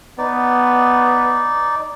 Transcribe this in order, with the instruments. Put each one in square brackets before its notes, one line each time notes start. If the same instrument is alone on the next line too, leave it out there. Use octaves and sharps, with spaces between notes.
[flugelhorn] B3 [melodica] D#4 D5